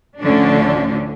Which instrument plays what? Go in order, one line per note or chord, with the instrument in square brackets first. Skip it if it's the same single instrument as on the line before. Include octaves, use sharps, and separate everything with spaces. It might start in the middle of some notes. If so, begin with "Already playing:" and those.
[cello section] D2 A2 D3 F3 C#4 D4